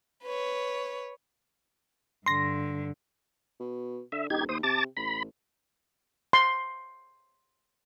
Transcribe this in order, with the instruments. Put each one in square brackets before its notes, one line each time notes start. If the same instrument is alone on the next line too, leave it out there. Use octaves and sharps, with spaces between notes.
[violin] B4 C#5
[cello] G2 D3 [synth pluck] C6 A#6
[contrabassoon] B2
[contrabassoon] D3 [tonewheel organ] E5
[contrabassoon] E1 [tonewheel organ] D#4 G4 G#6
[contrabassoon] D#2 [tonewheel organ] C5 D#6
[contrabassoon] C3 [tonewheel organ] A5 D6 A6
[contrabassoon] A1 [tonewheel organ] B5
[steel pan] C6